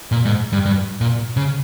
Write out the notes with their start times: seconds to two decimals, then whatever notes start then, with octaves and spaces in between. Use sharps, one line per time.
0.12 A#2
0.25 G#2
0.53 G2
0.66 G2
1.01 A#2
1.37 C#3